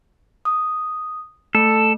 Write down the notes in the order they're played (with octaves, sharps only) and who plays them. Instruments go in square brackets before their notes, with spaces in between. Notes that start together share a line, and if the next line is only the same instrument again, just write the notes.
[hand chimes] D#6
[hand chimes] A3 [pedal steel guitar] A4